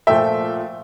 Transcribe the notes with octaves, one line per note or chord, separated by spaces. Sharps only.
A#2 F3 A3 E5 G5